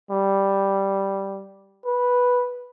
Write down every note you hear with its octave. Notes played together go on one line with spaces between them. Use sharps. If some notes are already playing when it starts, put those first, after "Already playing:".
G3
B4